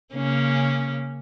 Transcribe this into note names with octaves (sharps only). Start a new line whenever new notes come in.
C#3 A#3 C#4